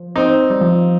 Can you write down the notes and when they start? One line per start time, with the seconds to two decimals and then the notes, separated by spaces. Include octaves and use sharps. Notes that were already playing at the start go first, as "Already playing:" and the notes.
Already playing: F3
0.16 C4 D#4
0.50 G3
0.61 F3